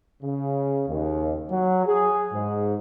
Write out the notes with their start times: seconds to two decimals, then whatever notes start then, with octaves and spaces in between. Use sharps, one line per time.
0.23 C#3
0.89 D#2
1.50 F#3
1.87 G#4
2.32 G#2